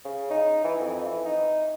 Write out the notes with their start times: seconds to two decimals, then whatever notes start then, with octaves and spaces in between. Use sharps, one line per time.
0.05 C#3
0.31 D#4
0.64 E3
0.80 F2
1.06 E3
1.25 D#4